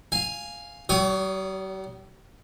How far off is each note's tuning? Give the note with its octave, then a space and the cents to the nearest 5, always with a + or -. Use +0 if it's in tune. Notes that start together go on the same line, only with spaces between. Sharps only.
F5 +0 G#5 +0
G3 -45 C#5 +20 D#6 -10